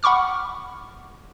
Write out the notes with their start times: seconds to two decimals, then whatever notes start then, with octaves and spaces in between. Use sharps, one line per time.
0.03 F#5 B5 C#6 D6 F6